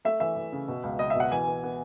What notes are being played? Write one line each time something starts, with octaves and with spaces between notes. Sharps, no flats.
A3 E5
E3 E5
E3
C#3
B2
C#2
C#2 D#5
E5
B2 F#5
E3 G#5
B3
B3